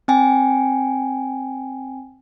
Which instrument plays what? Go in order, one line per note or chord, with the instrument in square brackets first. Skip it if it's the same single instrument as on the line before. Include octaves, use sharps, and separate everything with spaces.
[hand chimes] C4 G5 G#5